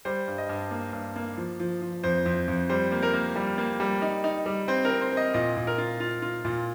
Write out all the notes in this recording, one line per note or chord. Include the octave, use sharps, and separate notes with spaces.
G3 C5
G2
D#5
G2
A#3
G2
A#3
F3
F3
F3
F2 C5
F2
F2
G3 C5
A#3
A#4
A#3
G3
A#3
G3
D#4
D#4
G3
C4 C5
A#4
C4
C5
C4 D#5
A#2 D#5
A#2
A#4
F4
F4
F4
A#2